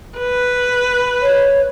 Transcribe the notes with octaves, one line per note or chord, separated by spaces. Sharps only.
B4
C#5